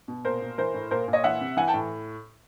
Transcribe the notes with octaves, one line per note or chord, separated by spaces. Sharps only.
B2
A#2 A#4 C5
A#2
E3 A#4 C5
A2
A#2 A#4 C5
A#2
C#5 D#5
E3 E5 F#5
C3
E3 F#5 G#5
G5 A5
A2